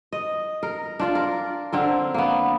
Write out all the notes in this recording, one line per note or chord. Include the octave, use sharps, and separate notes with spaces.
D#5
A#4
D4 F4 D5
A#4
D3 C4 A#4
A#3 B3